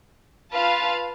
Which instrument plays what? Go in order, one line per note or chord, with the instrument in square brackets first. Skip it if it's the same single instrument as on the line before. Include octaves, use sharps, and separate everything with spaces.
[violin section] F4 B4 F5 A5